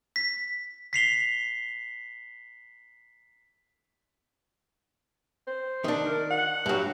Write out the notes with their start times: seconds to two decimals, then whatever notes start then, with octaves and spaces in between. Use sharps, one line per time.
0.16 B6
0.93 B6 C7 F7 G7
5.47 C5
5.84 D#3 D4
6.07 A#4
6.31 F#5
6.66 G2 F#3